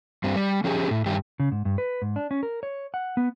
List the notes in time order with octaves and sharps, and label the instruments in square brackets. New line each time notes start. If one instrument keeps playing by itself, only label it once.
[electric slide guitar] G2 C4
G3
F3 C#4 G4 G#4
A2
G2 D#3 G4
C#3
G#2
G2
B4
G#2
D4
C#4
A#4
C#5
F#5
B3